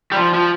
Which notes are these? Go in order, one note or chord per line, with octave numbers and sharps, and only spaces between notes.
G3
F3
F3